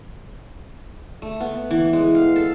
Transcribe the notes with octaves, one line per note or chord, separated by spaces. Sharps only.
A3
B3
E3
G#3
F5
A4